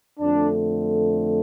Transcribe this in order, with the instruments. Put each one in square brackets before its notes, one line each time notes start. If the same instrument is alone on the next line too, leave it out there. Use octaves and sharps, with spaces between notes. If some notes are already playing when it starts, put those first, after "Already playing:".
[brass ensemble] F2 D3 A3 D4